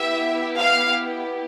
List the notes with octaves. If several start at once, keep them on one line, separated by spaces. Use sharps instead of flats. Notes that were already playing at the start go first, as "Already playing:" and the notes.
Already playing: B3 E4 G4 E5
F5